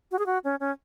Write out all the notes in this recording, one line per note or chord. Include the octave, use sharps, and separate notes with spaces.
F#4
G#4
F#4
C#4
C#4